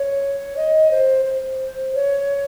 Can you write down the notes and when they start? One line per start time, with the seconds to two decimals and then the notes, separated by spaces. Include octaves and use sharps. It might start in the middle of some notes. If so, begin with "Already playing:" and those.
Already playing: C#5
0.57 D#5
0.91 C5
1.26 C5
1.95 C#5